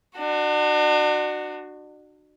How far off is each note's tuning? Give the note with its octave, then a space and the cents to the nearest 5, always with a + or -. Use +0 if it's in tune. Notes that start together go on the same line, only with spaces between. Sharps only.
D4 +40 F#4 +0